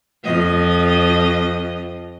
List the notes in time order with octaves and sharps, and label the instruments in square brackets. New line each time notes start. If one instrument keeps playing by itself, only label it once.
[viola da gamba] F2 F3 D#5